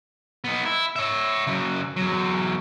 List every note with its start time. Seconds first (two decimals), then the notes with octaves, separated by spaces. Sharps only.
0.44 B3 D#4
0.65 E4
0.96 C#5 E5
1.47 C#3 F#3
1.96 E2 F#3